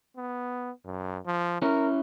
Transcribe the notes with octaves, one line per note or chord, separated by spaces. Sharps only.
B3
F#2
F3
C#4 E4 A#4 C#5